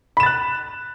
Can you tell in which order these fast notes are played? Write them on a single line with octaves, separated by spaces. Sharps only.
B5 E7 A6 F#6